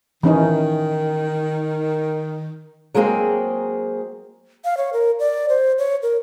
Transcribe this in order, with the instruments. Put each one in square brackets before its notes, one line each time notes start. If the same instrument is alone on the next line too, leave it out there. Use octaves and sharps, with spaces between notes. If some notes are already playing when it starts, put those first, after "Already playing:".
[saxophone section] D#3 [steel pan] E3 C#4 D#4
[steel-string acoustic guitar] F#3 G#3 A#3 C4 G#4
[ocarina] F5
C#5
A#4
D5
C5
C#5
A#4